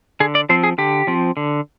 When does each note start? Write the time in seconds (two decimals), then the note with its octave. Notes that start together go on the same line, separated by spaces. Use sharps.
0.20 D3 G#4
0.35 D5
0.49 F3 C4 C5
0.63 G#4
0.78 D3 G4
1.07 F3 C4
1.37 D3